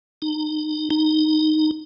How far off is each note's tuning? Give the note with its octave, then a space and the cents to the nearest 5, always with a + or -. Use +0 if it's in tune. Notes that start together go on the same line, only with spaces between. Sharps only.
D#4 -25
D#4 -5